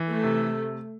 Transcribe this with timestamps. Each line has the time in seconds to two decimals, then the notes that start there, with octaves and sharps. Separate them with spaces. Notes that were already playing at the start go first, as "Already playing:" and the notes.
Already playing: E3
0.09 A3
0.24 C3